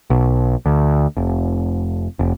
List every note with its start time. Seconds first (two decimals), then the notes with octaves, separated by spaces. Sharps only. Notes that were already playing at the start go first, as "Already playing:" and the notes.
0.10 B1
0.66 D2
1.17 F1
2.19 F1